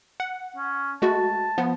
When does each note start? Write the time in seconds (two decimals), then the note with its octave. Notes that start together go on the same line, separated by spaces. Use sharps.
0.20 F#5
0.56 C#4
1.02 G#3 A3 F#4 A5
1.58 F3 B3